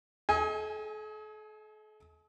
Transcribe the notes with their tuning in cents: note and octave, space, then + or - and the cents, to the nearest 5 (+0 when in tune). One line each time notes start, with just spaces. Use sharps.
A4 -45 D#5 +40 G#5 +0